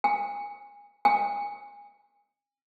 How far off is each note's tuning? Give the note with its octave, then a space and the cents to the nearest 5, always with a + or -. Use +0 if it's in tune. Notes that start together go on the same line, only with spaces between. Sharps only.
G#5 -30
G#5 -30